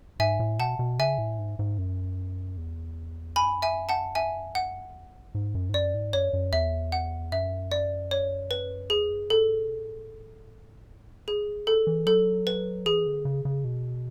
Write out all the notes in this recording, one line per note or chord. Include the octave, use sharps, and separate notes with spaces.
G#2 E5 G#5
A2
B2 F#5 A5
B2
C#3 E5 G#5
A2
G#2
G#2
F#2
E2
F#2 G#5 B5
E5 G#5
F#5 A5
E5 G#5
F#5
E2
G#2
F#2
G#2
F#2 D5
G#2
F#2 C#5
F#2
E2 E5
F#5
F#2 E5
D5
C#5
B4
E2 G#4
F#2
G#2 A4
A2
B2
A2
B2 G#4
C#3
E3 A4
E3
F#3 A4
B4
E3 G#4
D3
C#3
C#3
B2